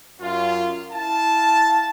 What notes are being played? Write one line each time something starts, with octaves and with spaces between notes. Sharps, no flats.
F#2 C#4 F4
E4 F5 A5